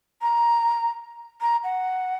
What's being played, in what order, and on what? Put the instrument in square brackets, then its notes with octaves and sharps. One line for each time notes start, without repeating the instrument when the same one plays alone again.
[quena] A#5
A#5
F#5